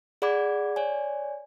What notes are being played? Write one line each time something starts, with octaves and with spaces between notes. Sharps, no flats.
G#4 D5 F#5 B5 D6 G#6
C#5 D5 G#5